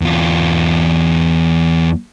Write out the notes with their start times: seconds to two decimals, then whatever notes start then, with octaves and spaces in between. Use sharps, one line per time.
0.02 E2 F4